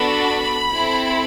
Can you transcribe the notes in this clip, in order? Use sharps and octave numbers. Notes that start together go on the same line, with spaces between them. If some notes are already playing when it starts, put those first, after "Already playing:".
Already playing: B3 D4 F#4 A4 B5
C4 E4 A4